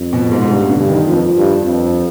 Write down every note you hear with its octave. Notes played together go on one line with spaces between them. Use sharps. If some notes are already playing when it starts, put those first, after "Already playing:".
Already playing: F2
B2
G#2
G#2
G2 B2
D3
G2
D#3
F2 F3
G2
F2